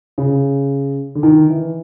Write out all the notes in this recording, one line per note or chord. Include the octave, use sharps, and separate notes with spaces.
C#3
D3
D#3
E3